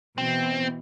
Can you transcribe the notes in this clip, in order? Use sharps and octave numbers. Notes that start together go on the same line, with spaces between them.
B2 E3 C4